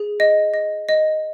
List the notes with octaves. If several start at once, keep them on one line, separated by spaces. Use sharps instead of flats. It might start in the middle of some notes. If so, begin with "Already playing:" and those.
Already playing: G#4
D#5
D#5
D#5